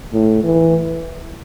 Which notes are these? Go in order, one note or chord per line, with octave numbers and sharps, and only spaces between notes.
A2
E3